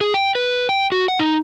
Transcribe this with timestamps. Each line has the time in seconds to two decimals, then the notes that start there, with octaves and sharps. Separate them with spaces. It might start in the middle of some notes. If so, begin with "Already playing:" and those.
0.01 G#4
0.14 G5
0.35 B4
0.69 G5
0.92 F#4
1.08 F#5
1.19 D#4